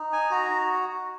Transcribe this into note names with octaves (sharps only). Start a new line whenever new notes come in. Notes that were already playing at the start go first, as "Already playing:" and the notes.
Already playing: D#4
G#5
F#4 A#5